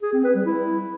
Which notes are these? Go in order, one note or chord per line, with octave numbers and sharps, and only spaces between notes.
G#4
C4
B4
G3
E4